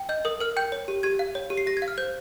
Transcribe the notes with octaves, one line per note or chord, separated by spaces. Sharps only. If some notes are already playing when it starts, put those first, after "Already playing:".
Already playing: G5
D#5 G6
A#4 D#6
A#4 F6
G5 G6
C#5
G4
G4 G#6
F5
C#5
G4
C7
G4 A#6
G#6
F5
F6
C5 G6